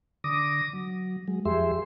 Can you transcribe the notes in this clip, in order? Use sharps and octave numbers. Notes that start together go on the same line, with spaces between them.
D3 D6 D#6 A#6
F#3
F#3 G#3
F2 F3 G4 G#4 E5 C6